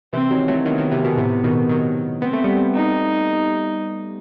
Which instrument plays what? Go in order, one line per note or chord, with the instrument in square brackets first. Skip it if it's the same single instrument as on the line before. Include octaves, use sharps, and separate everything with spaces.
[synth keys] C3 E3 [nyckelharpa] C4
[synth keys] D#3 F#3
F#3 A3
[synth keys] D#3 F#3 [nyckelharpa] B3
[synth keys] D#3 F#3
C3 E3
B2 D#3
A2 C3
B2 D#3
D#3 F#3
[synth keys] B3 [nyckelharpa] C4
[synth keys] A3
G3 B3
[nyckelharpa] D#4